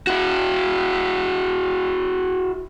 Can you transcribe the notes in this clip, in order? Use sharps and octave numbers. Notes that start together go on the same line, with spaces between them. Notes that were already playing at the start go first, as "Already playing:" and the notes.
E4 F#4